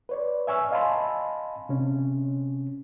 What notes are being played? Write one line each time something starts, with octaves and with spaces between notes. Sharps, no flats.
B4 C#5 D5
E5 G#5 C#6 E6 F6
D#5 F5 G#5 A5 B5 C6
C3 C#4